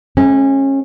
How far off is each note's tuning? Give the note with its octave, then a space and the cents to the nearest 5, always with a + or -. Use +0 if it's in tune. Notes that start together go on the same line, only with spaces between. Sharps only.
G#3 +45 C#4 -25